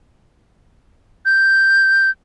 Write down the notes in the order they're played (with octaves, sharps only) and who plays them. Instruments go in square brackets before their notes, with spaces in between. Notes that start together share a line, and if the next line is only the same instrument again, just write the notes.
[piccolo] G6